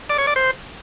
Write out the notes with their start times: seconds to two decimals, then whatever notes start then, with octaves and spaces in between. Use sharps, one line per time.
0.09 D5
0.18 C#5
0.27 D5
0.36 C5